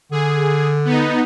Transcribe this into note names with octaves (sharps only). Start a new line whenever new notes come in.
D3 G#4
B3 D#4